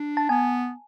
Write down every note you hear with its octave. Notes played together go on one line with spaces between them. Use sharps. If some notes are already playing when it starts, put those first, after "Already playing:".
Already playing: D4
A5
B3 G#5